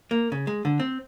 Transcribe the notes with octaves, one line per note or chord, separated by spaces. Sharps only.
A#3
C#3
G#3
D3
C4